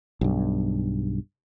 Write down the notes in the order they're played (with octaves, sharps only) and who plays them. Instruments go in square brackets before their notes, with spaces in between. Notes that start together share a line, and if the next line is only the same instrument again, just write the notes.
[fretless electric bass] B1 G2